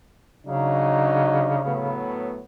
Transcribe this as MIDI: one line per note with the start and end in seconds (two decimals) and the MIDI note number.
0.47 2.01 49
0.47 1.59 54
0.47 1.59 62
0.47 1.59 63
1.65 2.41 45
1.65 2.41 54
1.65 2.41 59